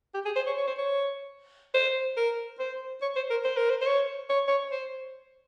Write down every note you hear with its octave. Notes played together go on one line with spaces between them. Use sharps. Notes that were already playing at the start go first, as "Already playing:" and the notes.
G4
G#4
C5
C#5
C#5
C5
C#5
C5
A#4
C5
C#5
C5
A#4
C5
A#4
C5
C5
C#5
C#5
C#5
C5